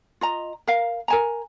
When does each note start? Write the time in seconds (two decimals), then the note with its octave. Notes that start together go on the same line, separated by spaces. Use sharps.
0.21 F4 D#5 A#5
0.67 A#4 F5
1.08 A#4 G#5 A#5